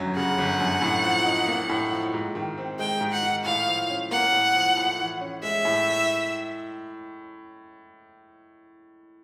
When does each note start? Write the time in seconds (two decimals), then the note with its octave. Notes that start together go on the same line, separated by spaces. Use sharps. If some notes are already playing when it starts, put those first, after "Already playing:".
Already playing: G1 F#2 F#3
0.16 C#3 F#5
0.38 G1
0.60 F#2
0.82 A2
1.04 F3
1.25 D#4
1.48 A#3
1.69 A2
1.92 F3
2.14 G#2
2.35 D#3
2.58 C4
2.79 G#3 G5
3.01 G#2
3.12 F#5
3.23 D#3
3.45 A2 F5
3.67 F3
3.90 C#4
4.11 A#3 F#5
4.32 A2
4.55 F3
4.77 A2
4.99 E3
5.21 C#4
5.43 G#3 E5
5.65 A2